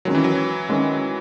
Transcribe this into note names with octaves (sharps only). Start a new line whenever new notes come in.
D#3 F#3 G#3 C#4
E3
F#3
D#3 G#3 C#4